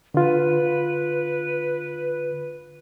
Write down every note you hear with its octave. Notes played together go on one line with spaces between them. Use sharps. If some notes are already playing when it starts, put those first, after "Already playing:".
D3 F4 B4